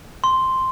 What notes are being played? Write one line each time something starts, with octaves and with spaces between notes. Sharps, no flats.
C6